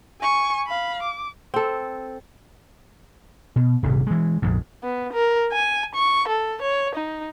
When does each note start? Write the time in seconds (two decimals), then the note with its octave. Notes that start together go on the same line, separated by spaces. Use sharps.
0.21 G#5 C#6
0.66 F5 B5
1.02 D6
1.54 C4 A4
3.56 B2
3.83 D#1 G#1 G2 C3
4.07 E3 G#3
4.42 A#1 F2 G#2
4.83 B3
5.13 A#4
5.52 G#5
5.95 C#6
6.28 A4
6.62 C#5
6.95 D#4